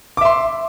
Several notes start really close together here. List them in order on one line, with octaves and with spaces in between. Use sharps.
D6 E5 C6